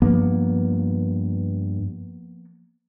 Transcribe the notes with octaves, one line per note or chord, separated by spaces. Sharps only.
G2 F3 A#3 B3